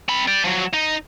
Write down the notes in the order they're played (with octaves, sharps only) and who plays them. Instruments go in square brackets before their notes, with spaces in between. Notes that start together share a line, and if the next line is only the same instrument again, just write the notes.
[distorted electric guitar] C4 B5
D5 G5
F3 F#3
D#4